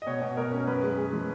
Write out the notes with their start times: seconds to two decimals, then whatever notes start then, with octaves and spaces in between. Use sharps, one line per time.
0.02 D#5
0.07 B2 C#5
0.22 B2
0.37 B2 A#4
0.52 C#4
0.67 F#2 B4
0.83 G#3
0.98 G#3
1.13 F3